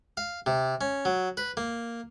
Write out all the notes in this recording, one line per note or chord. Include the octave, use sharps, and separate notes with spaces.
F5
C3
C#4
F#3
B4
A#3